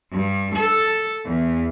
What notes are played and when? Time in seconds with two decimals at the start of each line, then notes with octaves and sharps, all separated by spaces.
0.13 G2
0.54 A4
1.26 E2